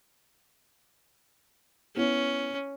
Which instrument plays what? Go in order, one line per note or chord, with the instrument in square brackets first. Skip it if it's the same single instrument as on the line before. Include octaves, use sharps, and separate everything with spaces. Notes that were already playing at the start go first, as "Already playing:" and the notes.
[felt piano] B3 E4 [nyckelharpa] C#4